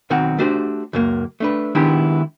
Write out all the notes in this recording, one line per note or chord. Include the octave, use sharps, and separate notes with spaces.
B1 D#3 C4 F#4 F#5
A3 D4 F#4 G4 B4 C5
C#2 F#2 A#3
A3 D4 B4
D#3 G#3 B3 D4 E4 G4